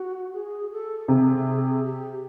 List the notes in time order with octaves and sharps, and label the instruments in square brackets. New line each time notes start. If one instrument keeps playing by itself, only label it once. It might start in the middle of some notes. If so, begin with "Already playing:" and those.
Already playing: [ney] F#4
G#4
A4
[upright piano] C3 [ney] G#4
[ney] G4